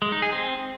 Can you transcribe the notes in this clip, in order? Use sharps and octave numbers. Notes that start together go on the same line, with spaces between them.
G#3
D#4
G#4
C4